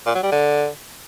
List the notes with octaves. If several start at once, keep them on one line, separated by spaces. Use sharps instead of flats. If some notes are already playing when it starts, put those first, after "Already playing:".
A#2
F#3
G3
D3